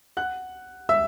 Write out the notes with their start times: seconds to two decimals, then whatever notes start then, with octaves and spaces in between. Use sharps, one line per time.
0.17 F#5 F#6
0.89 E5 E6